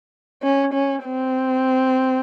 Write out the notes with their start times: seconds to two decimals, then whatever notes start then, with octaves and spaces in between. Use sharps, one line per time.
0.42 C#4
0.74 C#4
1.05 C4